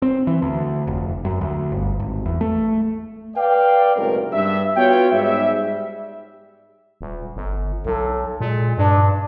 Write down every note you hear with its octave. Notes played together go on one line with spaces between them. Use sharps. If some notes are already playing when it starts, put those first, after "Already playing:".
C4
E3
D2
F1
F#2
D2
G1
G#1
E2
A3
B4 D5 F5 G5
F#1 B1 A2 C3 G#3 A#4
G2 E5
B3 F4 F#4 C#5 G5
G#2 G3 G#4 E5
G3
D#1
G1
B1 A4
A#2 G#3
G2 D4